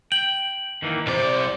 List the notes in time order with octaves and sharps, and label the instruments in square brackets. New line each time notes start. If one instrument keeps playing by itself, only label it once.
[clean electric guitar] G5 [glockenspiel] F#7
[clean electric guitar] D#3 E3 A#3
[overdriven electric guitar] C2 D5 [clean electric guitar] C3 [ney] C5